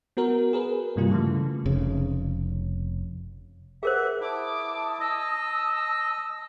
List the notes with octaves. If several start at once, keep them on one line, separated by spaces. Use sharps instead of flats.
B3 F#4 A#4
G#4 A#4 B4
G2 C3 G3 A#3 F4
C#3 E3 A3
F1 C#3
G#4 A#4 C5 E5 F#5
E4 A5 D6 D#6
D#5 E6